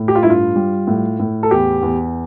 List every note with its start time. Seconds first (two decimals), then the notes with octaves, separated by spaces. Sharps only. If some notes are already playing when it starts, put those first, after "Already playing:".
Already playing: A2
0.08 G4
0.15 F4
0.23 G2 E4
0.30 F4
0.56 G3
0.87 A2
1.20 A2
1.43 A4
1.51 E2 G4
1.83 E2